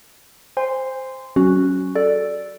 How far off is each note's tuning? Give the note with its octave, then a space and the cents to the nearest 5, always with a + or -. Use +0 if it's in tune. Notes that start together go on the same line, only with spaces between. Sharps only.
C5 +0 G#5 -35 C6 -15
F#3 +20 C#4 +0 F#4 +0
A4 +0 D5 +0